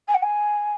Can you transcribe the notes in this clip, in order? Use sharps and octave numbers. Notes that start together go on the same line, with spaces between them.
G#5
F#5
G#5